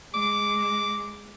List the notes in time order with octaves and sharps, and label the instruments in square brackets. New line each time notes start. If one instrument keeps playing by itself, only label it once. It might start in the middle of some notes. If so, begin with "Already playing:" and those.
[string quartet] G#3 [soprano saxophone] D6